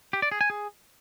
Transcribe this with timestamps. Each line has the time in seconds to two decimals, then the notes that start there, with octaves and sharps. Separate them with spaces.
0.13 G4
0.22 D5
0.32 G#4
0.41 G#5
0.50 G#4